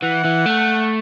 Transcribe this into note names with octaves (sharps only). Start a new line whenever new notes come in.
E3 F#5
E3
A3